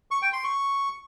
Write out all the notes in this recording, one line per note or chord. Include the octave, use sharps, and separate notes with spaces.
C#6
G5
C6
C#6